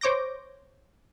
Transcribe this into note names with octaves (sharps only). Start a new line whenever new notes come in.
C5 C#5 D6 G6 A#6